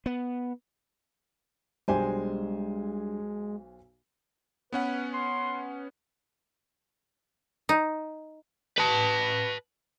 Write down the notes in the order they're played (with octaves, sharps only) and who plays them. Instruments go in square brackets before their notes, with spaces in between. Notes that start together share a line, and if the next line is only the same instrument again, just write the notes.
[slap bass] B3
[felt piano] B1 C5 G#5 [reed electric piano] G3 D4 G4 [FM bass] G#3
[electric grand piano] B3 C#4 F#5 [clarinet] B4
[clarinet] C6
[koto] D#4
[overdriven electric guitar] B4 A5